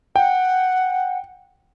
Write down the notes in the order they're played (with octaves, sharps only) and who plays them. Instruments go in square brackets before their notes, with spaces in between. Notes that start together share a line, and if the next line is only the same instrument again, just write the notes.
[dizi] F#5 [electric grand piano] G5